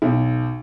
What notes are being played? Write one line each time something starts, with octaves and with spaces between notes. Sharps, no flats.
B1